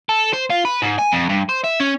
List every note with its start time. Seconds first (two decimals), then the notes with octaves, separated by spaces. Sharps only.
0.09 A4
0.33 C5
0.50 F4
0.65 B4
0.82 G#2
0.99 G#5
1.12 F2
1.30 G2
1.49 C5
1.64 E5
1.80 C#4